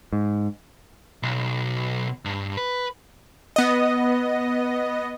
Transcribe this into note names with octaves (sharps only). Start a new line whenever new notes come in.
G#2
B1
G2
B4
B3 D#5